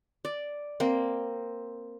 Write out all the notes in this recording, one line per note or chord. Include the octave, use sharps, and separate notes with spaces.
D5
A#3 C4